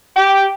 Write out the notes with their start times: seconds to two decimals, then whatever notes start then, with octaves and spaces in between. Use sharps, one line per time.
0.16 G4